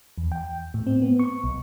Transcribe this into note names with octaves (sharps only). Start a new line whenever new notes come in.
E2
G5
A2
C4
B3
C#6
B1